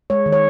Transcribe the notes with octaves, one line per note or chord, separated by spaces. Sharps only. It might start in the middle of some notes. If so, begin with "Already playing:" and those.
G#3 C#5
D#3
C#5